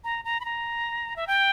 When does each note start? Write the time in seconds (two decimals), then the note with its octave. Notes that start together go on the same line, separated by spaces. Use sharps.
0.04 A#5
0.25 A#5
0.40 B5
0.45 A#5
1.16 E5
1.27 G5